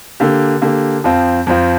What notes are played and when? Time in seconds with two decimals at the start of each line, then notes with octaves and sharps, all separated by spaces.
0.20 D3 A#3 G4
0.62 D3 A#3 G4
1.04 F2 F3 C4 F4
1.47 F2 F3 C4 F4